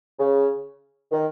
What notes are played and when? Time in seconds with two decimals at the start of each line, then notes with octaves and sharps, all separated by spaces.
0.20 C#3
1.12 D#3